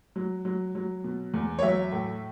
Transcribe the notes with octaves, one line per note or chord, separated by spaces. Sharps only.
F#3
F#3
F#3
B2
E2
C#5
F#3 E5
A2